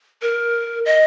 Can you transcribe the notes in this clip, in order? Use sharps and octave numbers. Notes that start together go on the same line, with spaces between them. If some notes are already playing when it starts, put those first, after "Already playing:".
A#4
D#5